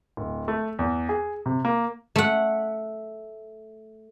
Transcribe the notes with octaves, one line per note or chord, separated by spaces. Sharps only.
D1
A3
E2
G#4
C3
A#3
A3 F#5